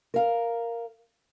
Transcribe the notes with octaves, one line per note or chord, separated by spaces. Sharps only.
A#4 F5